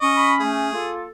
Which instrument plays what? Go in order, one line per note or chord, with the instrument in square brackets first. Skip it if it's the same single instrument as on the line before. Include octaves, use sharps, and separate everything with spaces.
[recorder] C#4 [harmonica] D#5 C#6
[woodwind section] B5
[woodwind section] A3 [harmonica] G#4
[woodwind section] A#3 F4 A4